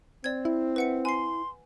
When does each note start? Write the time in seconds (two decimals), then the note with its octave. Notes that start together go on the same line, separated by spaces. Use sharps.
0.24 C4 D5 G#6
0.45 E4
0.76 B4 E5 F#5 C#7
1.05 G#5 C6 C7